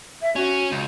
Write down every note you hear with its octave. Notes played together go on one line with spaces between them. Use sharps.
E5
C#4 F#4
C#2